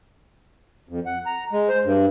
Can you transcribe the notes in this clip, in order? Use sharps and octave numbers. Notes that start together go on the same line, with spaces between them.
F2
F#5
A#5
G#3
C5
G2